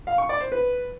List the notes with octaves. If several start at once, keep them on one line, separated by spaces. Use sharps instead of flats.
F5
C#6
D5
C5
B4